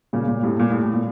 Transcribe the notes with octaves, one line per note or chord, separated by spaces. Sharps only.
A#2 C#3
A#2
A2 C3
A#2
A2
A2
A#2